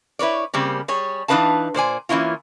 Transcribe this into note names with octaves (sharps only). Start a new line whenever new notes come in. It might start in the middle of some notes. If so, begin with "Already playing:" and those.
E4 B4 C#5 D5
C#3 G3 A#3 C4
G3 G#4 C#5
E3 D4 D#4 B4 F5 A5
A#2 C5 D5 G#5
E3 A#3 C#4 E4 F4